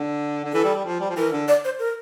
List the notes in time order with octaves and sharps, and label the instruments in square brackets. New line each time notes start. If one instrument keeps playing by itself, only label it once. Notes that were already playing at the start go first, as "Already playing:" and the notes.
Already playing: [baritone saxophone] D3
D3
[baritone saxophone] E3 [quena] A4
[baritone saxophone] G3
G3
F3
G3
F3
[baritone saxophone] E3 [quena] A#4
[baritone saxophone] D3
[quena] D5
C5
A#4